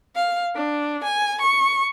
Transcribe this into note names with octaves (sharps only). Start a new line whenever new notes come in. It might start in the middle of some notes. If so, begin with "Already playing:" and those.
F5
D4
G#5
C#6